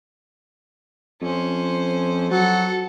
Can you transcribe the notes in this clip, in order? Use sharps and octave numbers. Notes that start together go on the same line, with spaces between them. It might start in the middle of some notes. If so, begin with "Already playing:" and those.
F2 C#4 C5
F#3 A4 F#5